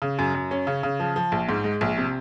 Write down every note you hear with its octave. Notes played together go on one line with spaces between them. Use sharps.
C#3
F#2
F#2
C#4
C#3
C#3
F3
F3
A#1
G#2
G#3
A#1
C3